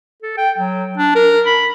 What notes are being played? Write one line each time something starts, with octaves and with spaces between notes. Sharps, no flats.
A4
G5
F#3
D4
A#4
B5